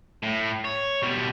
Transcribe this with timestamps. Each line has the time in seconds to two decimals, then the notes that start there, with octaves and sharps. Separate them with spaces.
0.23 A2
0.64 C#5
1.03 B2 G3